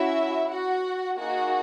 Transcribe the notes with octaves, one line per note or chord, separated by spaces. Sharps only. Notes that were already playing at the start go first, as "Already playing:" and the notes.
Already playing: C#4 E4 F#4 E5
F#4 F#5
A#3 D#4 F#4 G#4 F#5